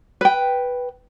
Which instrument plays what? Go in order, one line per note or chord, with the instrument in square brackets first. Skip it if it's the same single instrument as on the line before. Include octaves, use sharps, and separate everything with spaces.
[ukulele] B4 G5